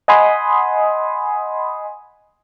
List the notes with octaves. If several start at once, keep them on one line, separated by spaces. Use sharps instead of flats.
D#5 F#5 G#5 B5 C6 D#6